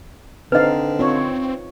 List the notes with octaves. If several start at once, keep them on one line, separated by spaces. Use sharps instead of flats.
D3 C4 D#4 B4 D#5 F5
C4 F4 C#5